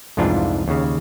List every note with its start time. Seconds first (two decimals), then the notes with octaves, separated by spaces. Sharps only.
0.17 C2 F2 G#2 E3 D4 F4
0.68 D#2 C#3